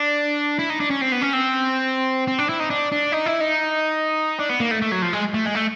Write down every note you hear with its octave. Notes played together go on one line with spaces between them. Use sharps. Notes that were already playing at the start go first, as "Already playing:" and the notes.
Already playing: D4
E4
D#4
D4
C#4
C4
B3
C#4
C4
C4
D4
E4
D#4
D4
D4
D#4
E4
D#4
D4
B3
A#3
A3
A3
F#3
F3
G#3
A3
G#3
A3